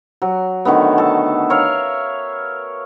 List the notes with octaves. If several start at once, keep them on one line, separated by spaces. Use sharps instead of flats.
F#3
D3 D#3 A3 B3
A4 A5
A#4 C#5 E5 F5